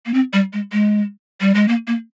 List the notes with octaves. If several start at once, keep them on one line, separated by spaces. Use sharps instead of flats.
A#3
C4
G3
G#3
G#3
G3
G#3
A#3
A#3